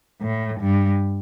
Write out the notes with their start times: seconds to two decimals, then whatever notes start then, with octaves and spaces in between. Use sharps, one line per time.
0.21 A2
0.61 G2